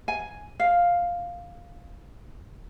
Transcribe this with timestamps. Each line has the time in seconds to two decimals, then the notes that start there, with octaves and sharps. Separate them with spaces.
0.08 G#5
0.60 F5